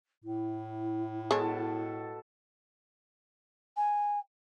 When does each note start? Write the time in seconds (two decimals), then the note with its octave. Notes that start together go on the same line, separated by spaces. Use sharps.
0.24 A2 E4
1.31 B2 G#3 A4 C#5 A5
3.76 G#5